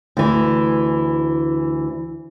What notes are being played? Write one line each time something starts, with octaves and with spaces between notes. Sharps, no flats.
D2 E3